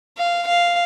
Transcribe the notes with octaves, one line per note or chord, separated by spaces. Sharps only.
F5
F5